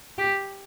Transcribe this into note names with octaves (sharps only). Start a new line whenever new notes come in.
G4